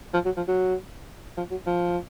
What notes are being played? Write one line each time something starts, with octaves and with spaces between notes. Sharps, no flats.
F3
F#3
F3
F#3
F3
F#3
F3